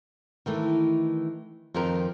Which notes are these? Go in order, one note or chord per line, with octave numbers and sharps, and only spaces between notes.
D#3 E3 A3
F2 D#3 F3 A#4